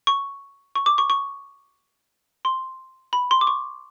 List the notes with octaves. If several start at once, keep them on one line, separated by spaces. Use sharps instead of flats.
C#6
C#6
D6
C#6
C#6
C6
B5
C6
D6
C#6